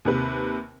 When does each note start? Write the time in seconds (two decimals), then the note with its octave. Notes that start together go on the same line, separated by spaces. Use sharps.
0.05 D#2 C3 B4